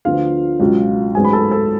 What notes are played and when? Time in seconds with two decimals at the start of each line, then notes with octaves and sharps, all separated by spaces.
0.05 D2 D3 F3 B3 F4 F5
0.60 C#2 B2 F#3
1.15 A1 G#2 F#3 B3 G#4 G#5
1.25 B5
1.33 A4 A5
1.51 A4 A5